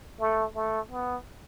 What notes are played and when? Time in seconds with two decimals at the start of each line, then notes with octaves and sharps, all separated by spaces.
0.20 A3
0.55 A3
0.91 B3